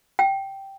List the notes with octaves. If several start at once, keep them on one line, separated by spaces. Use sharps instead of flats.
G5